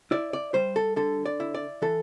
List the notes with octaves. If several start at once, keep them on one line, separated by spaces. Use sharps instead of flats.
E4 D5
D5
G3 C5
A4
D3 A4
D5
E4
D5
E3 A4